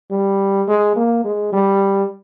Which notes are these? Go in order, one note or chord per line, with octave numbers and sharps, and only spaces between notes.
G3
G#3
A#3
G#3
G3